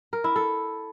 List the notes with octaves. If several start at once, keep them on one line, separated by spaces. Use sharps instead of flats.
A#4
E4
A4